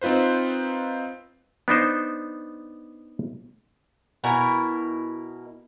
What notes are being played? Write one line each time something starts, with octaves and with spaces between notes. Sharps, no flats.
C4 D#4 F4 B4 C5
B3 D4 D#4 C5
B2 E4 A#4 G#5